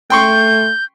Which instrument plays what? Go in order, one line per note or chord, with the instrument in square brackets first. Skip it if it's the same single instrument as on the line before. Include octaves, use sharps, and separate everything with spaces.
[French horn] A3 [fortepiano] G5 C6 C#6 [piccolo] G6